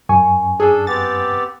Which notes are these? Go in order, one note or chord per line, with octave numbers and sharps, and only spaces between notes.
F#2 G#5 C#6
D4 G#4 A4
B3 C4 G4 A6